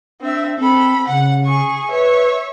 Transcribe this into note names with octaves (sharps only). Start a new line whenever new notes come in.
C4 D4 E5
C4 A4 B5
C#3 F#5
G#4 C#6
B4 C#5 E5